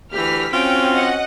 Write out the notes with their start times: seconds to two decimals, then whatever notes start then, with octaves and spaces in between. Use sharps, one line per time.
0.12 D2 E3 G4 F6 B6
0.53 C4 C#4 F4 F#4 G5
0.94 D#5 F#5